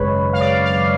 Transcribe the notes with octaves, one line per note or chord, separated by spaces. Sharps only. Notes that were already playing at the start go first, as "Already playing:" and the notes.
Already playing: G#1 F#2 C#3 G#3 B4 C#5
F5
D5
F5